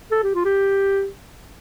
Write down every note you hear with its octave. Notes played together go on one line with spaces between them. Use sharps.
A4
G4
F4
G4